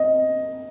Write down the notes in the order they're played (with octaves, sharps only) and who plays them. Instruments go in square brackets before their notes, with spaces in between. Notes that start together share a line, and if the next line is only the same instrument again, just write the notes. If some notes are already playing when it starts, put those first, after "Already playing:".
Already playing: [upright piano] D#5